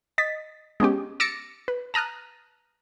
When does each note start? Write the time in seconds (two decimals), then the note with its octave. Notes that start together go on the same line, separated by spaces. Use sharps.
0.18 D#5 A6 B6
0.80 G#3 B3 C#4 G4
1.20 D6 E6 A6 A#6 C#7 D7
1.68 B4
1.94 A5 A#5 D#6 F6 F#6